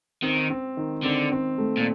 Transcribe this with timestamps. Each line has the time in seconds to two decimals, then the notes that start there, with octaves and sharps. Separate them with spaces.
0.22 D#3 C4
0.50 C4
0.77 D#3
1.04 D3 C4
1.32 C4
1.58 A3
1.77 A#2